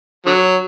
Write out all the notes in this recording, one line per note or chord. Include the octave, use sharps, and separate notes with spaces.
D3 F#3